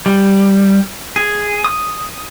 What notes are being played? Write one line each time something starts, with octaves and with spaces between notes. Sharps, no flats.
G3
G#4
D#6